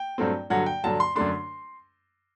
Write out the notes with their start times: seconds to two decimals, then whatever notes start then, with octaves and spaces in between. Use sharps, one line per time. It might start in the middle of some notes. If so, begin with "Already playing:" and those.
Already playing: G5
0.18 G2 F#3 A3 C4
0.50 G2 D3 F#3 F#5
0.66 G5
0.84 G2 D3 F#3 A5
1.00 C6
1.16 F#2 D3 A3 D4 C6